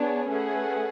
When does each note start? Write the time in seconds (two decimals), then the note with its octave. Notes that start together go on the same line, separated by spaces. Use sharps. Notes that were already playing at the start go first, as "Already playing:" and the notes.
Already playing: B3 D4 G#4 C#5
0.27 A3 C#4 G#4 B4 F#5